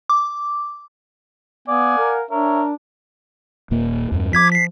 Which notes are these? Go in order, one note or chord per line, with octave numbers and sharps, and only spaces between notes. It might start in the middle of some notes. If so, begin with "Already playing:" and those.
D6
B3 D5 F5 F#5 G#5
A#4
D4 A#4 C#5 E5
D#1 A#2 A#3
E2 G2
F3 D6 G#6 B6
B6 C7